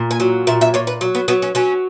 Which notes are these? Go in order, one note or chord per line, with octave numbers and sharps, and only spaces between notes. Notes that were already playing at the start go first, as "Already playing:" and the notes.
Already playing: A#2
G#5
F#3
A#2 E5
E5
A#2 C#5
B4
F#3
B3
F#3 B3
C#4
F#3 C#4